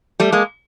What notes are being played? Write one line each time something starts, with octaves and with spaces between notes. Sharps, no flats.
G3 A3
G#3 A#3